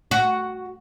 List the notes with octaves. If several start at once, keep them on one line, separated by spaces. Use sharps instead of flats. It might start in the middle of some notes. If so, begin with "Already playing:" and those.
F#4